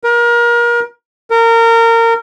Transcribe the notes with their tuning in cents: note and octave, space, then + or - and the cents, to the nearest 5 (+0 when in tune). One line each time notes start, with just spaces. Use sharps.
A#4 +30
A#4 -25